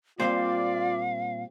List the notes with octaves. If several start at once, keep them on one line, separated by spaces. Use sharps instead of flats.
A#2 G3 C4 F4 C5 D5 F5